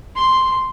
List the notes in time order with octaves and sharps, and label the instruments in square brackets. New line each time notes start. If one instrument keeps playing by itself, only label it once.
[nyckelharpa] C6